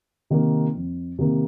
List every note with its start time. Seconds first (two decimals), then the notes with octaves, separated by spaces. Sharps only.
0.30 C3 D#3 A#3
0.74 F2
1.18 C3 D#3 A#3